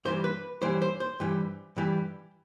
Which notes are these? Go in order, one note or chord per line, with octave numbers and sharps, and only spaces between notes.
G2 E3 G3 C5
B4
G2 E3 G3 C5
C5
C5
G2 E3 G3
G2 E3 G3